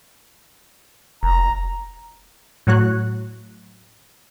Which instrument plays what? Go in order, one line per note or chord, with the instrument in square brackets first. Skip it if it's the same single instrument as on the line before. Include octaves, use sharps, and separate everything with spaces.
[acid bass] F1 [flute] A#5
[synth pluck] A2 F#3 F#4 C#5 F#6